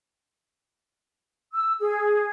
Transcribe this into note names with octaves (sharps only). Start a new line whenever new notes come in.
E6
G#4